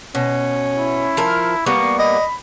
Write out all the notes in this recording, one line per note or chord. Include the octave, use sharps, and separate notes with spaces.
B2 C#4
E4
F3 A#4
G3 A#3 B3 C#6
D#5 B5